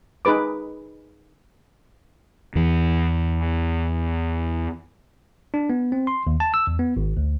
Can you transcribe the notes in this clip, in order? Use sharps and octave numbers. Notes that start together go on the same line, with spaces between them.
D#4 G#4 B4 D6
E2 E3
D4
B3
C4
C6
D#2
A5
E6
E2
B3
G#1
D2